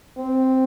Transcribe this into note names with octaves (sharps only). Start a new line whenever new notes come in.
C4